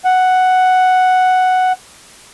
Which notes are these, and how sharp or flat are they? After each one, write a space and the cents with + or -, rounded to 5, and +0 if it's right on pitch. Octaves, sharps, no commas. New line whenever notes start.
F#5 +0